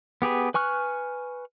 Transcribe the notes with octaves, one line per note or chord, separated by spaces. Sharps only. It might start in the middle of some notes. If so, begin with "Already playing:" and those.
B3 G4 G#4 B4
B4 G#5 C#6 F6 F#6